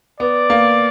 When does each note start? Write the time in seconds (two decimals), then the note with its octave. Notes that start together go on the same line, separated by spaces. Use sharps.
0.20 B3 D5
0.50 A#3